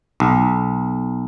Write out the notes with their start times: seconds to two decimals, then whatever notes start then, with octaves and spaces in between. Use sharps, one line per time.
0.20 B1